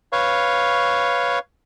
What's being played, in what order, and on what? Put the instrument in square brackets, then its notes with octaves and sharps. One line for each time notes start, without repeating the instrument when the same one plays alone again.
[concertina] B4 C#5 F5 C#6